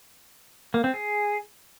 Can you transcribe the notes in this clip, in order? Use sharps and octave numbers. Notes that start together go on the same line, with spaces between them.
A#3
C4
G#4